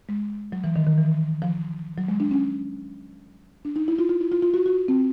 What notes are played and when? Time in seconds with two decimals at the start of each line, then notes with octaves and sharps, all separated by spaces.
0.09 G#3
0.52 F#3
0.64 E3
0.76 D#3
0.87 D#3
0.98 E3
1.42 F3
1.98 F#3
2.08 G#3
2.20 D4
2.31 C#4
3.65 D4
3.76 D#4
3.88 E4
3.99 F4
4.09 F4
4.21 E4
4.32 F4
4.43 F4
4.54 F#4
4.66 F#4
4.88 C4